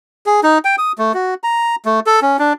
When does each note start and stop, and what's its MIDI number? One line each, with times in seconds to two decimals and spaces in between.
0.26 0.40 68
0.43 0.58 63
0.65 0.76 79
0.78 0.92 87
0.98 1.12 57
1.14 1.34 66
1.44 1.76 82
1.85 2.00 57
2.07 2.20 69
2.22 2.37 61
2.39 2.53 62